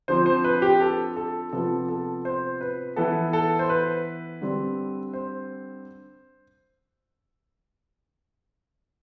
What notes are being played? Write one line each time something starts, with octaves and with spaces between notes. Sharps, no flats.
D3 F3 C4 C5
C5
B4
G4
A4
A4
C3 F3 B3 A4
A4
C5
B4
E3 B3 A4
A4
C5
B4
D3 G3 C4
C5